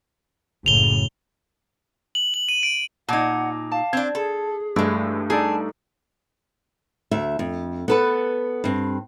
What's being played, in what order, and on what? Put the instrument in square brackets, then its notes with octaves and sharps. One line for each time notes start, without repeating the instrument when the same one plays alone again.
[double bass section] F#1 A2 C#3 [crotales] F7 G7
[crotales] F#7
F#7
D#7
D7
[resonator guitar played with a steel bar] A#2 D#4 [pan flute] F#5 [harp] A5 D6 G#6
[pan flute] F5 [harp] A5
[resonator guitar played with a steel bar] C4 D4 [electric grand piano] G#6
[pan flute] G#4 [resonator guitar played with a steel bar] A4
[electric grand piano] G2 A3 E6 [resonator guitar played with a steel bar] E3 G#3 [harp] D4
[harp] D#4 A4 D5 [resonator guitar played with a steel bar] G#4 [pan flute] A5
[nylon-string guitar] D2 E5
F2
B3 A4 B4
G2 C4